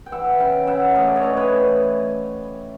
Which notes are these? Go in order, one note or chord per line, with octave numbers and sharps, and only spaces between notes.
G5
E3 E5 F#5
C#3 F5 G5
C#3 E5 F#5
A3 D#5 F5
D5
C#5 D#5
E3
B4 C#5